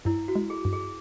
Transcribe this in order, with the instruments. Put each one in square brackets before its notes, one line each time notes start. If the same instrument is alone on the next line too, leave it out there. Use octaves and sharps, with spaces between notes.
[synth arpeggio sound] G2 [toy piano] E4
[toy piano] F#4
[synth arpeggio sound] G#3
[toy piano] G#4
[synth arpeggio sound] G2
[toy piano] G#4